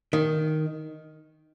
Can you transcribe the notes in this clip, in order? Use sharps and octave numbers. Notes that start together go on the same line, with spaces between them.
D#3